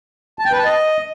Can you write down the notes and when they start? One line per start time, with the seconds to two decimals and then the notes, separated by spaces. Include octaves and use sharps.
0.39 A5
0.45 G5
0.52 B4
0.58 A5
0.65 D#5